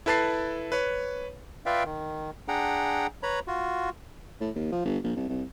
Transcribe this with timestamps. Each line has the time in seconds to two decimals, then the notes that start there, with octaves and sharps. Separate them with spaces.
0.06 E4 A4 B4 A5 A6 C7
0.72 B4 C#5
1.66 F4 B4 D5 E5 F5 G5
1.85 D#3
2.48 D4 G#4 F#5 G5 A#5
3.23 B4 C#5 A#5 B5
3.48 F4 F#4
4.40 A2
4.56 D#2
4.72 F3
4.85 G1
5.04 A#1
5.16 C2
5.29 C2